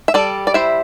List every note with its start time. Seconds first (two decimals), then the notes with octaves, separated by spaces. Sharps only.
0.08 E5
0.14 G3 A4 D5
0.47 D5
0.54 E4 C5 E5